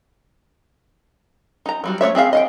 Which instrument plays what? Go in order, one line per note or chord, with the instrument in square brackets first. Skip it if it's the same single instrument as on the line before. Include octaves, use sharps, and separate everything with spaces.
[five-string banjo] D#4 A#5
F#3 G3 F#4
A3 B3 C#5 E5
C4 G#4 E5 F5
D#5 F5 G5